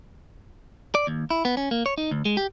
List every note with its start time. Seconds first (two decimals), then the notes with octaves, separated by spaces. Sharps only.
0.95 D5
1.07 D#2
1.30 E4
1.45 B3
1.57 C#4
1.71 A#3
1.86 C#5
1.98 D#4
2.11 D2
2.25 G#3
2.37 G4